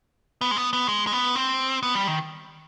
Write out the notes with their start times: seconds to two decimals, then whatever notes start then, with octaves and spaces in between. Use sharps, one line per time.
0.41 B3
0.51 G#3
0.56 B3
0.73 B3
0.88 G#3
1.07 G#3
1.12 B3
1.36 C4
1.83 B3
1.95 G3
2.07 D#3